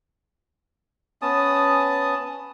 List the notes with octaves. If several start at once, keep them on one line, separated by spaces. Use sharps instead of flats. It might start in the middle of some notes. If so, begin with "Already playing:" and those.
B3 C#4 A5 D#6